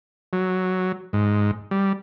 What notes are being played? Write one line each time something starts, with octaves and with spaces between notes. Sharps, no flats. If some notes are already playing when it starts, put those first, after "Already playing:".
F#3
G#2
G3